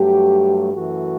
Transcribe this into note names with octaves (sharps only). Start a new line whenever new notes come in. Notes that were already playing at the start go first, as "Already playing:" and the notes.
Already playing: G2 F#3 A3 G4
F#2 E3 A3 F#4